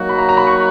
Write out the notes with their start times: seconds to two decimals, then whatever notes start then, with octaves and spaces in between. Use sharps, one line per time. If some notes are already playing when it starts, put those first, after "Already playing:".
Already playing: F#3 A#3 D#4 F#4
0.09 B5
0.18 A#5
0.29 A#5
0.37 B5
0.47 C#6